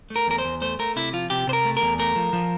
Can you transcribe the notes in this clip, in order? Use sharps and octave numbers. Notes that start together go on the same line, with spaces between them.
A3
A#4
E2 A#4
C5
E2
A3 C5
A3 A#4
C3 E4
F3 F4
C3 G4
C3 C5
A#4
A3
A#4
E2
A3 A#4
F3
F3